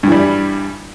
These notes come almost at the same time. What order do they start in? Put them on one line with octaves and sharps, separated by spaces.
G2 E3 G3